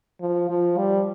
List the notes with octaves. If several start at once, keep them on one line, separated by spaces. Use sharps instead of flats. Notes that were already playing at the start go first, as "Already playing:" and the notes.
F3
F3
G3